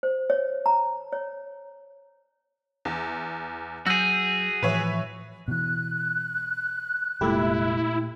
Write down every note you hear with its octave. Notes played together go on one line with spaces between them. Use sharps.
C5
C#5
A#5
C#5
E2
F#3 F#4 G#4 E6 G6
A2 E3 F3 B4 C#5 E5
B2 E3 F#6
F1 A#2 G#3 A3 E4 G4